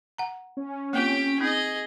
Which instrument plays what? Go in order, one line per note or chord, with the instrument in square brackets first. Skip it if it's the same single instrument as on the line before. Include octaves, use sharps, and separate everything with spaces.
[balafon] F#5 A#5
[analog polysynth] C#4
[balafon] A#3 C4 F4 [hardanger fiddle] G4 G5
[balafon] C4 D#4 [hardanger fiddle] G#4 D#5